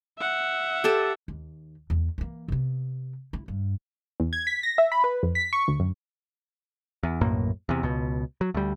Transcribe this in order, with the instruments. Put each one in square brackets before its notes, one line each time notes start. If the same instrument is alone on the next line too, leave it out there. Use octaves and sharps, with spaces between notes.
[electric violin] E5 F#5
[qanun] G4 A4 A5
[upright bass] D#2
E2
E3 A#3
C3 B3
E4
G2
[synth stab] E2
G#6
B6
A#6
E5
B5
B4
F2
B6
C#6
D2
F#2
[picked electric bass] E2
B1 F#2 A2 A#3
E2 C3
C#2 B2
F#3
D2 G3